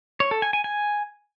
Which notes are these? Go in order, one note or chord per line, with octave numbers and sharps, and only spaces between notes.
C#5
A4
G#5
G#5
G#5